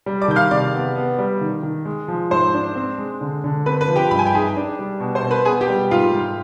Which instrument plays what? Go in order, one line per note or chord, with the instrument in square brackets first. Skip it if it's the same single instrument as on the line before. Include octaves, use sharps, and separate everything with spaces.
[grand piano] G3
[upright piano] D5 D6
[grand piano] D#3 [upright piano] G6
[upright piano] F5 F6
[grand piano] C3 [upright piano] D5 D6
[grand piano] B3
B3
G3
D#3
D#3
G#3
F3
[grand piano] G#2 [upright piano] C5 C6
[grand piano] D4
C4
G#3
D3
D3
[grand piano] C4 [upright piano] B4 B5
[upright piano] B4 B5
[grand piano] F3
[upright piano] G4 G5
[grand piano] G2 [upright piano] B5
[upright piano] G#5
G5
[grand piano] D#4 [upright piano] G#4 G#5
[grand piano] D4
G3
B2
[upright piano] C5 C6
[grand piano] B2
[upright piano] B4 B5
[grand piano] B3 [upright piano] G#4 G#5
[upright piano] G4 G5
[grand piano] G3
[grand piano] G#2 [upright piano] F4 F5
[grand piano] G#2